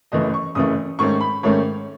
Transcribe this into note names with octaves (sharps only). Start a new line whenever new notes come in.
F#1 F#2 C#3 E3 A3 D#5
C#6
F#1 F#2 C#3 E3 A3 D#6
G#2 D#3 A3 C#4 C#6
B5
G#2 D#3 A3 C#4 C#5